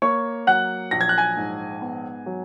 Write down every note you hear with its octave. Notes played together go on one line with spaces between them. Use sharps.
A#3 C#5 C#6
F#3 F#5 F#6
A#1 A#6
G#6
F#6
G#5 G#6
G#2
B3
F#3